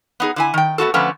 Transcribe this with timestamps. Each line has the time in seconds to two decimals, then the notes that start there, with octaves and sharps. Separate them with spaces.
0.20 B3 D#4 G#4
0.36 D3 E4 G#5
0.54 D#3 G5
0.78 A3 B3 F#4 A4
0.94 D3 F3 A3 B3 C#4